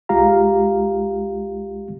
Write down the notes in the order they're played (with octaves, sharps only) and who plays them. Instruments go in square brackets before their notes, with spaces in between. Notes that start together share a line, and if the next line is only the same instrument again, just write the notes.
[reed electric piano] C2 G#3 F4 G4 F5 A#5